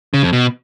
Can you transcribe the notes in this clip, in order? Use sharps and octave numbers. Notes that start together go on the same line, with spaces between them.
C#3
F2
B2